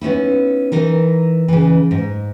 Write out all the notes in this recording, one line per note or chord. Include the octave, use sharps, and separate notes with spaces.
B3 C#4 D#4 E4
E3 D#4 A#4
C#3 E3
G#2